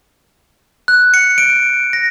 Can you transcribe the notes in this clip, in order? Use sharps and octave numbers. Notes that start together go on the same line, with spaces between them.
F#6
C#7
D7
A#6